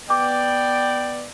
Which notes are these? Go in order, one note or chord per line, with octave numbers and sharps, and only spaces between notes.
B3 D5 G5 D6